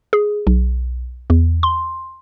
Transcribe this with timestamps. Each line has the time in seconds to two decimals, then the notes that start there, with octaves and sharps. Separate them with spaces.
0.13 G#4
0.47 B1
1.30 E2
1.63 C6